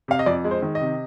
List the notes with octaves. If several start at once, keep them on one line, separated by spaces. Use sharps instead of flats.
C3 F5
D#5
F2 D5
G#3
C5
D#3
D#5
C3